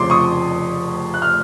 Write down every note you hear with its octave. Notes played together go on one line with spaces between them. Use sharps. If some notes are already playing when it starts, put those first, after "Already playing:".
Already playing: F1 F2 C#3 F3 C6 D6
C#6 D#6
F#6
F6